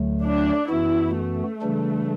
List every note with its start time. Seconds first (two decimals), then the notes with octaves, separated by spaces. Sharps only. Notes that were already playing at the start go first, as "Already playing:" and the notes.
Already playing: D2 D3 F#3 A3
0.23 D4
0.69 F#2 E3 B3 E4 F#4
1.15 A3
1.62 C#3 E3 G3 D4